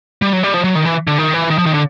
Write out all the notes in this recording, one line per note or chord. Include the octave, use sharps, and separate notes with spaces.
G3
F#3
G3
F3
F#3
D#3
E3
D3
D#3
E3
D#3
F3
D#3
D3